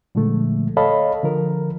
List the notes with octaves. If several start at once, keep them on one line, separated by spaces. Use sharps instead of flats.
A#2 D3 F3 G#3 A3
A4 C#5 D#5 F5 A5 B5
D3 F3 A#4